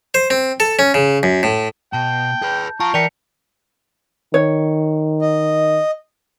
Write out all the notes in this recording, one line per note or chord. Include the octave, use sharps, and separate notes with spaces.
C5
C4
A4
C#4
C#3
F#2
A2
B2 G5 A5
G#4 B4 G6
F4 A5 A#5 C#6
E3 A#4 D5 G5 B6 C#7 F7
D#3 C#5
D#5